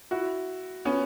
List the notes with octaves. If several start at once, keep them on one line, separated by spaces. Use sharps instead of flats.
E4 F#4
B3 C#4